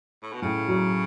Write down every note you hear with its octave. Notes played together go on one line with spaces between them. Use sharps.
A2
B2
A2 C#3
F#3